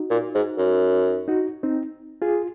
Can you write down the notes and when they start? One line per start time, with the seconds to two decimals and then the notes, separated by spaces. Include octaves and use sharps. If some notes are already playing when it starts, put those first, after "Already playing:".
Already playing: D#4 F#4
0.11 A#2
0.35 G#2
0.58 F#2
1.28 D#4 F#4
1.63 C4 D#4
2.22 F4 G#4